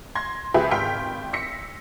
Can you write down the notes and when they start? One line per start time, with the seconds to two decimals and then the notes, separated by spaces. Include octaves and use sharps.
0.15 C6 G#6 A#6
0.54 C#2 G4 G#4 B4 E5
0.71 G#1 G5 C6 F6 B6
1.33 E6 A#6 B6 C#7